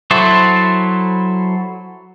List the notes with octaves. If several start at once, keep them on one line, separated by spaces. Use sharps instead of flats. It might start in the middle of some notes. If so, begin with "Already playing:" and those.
F#3 E4 A4 C5